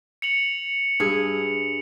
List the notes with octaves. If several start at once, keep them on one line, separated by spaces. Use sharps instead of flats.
C#7 F7 F#7
G2 G#4